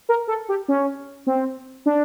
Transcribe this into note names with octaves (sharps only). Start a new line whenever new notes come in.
A#4
A4
G4
C#4
C4
D4